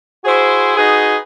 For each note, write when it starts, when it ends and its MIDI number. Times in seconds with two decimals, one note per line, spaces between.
0.25 0.74 64
0.25 0.74 66
0.25 0.74 68
0.25 0.74 72
0.77 1.16 63
0.77 1.16 66
0.77 1.16 68
0.77 1.16 71
0.77 1.16 75